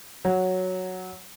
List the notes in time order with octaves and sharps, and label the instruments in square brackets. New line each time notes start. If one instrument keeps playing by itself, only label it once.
[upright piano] F#3